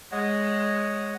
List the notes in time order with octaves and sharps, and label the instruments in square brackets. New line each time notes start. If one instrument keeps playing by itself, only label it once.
[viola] G#3 [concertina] C#5 D#5 F#5